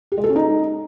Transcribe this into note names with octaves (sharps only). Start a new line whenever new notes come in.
G4
G#3
A4
C#4
D#4